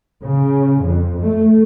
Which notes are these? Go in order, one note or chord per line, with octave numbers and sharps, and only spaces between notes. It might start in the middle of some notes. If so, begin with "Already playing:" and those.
C#3
F2
A3